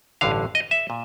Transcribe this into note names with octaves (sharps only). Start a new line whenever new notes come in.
A1 G2 D3 F5
D#5
E5
A#2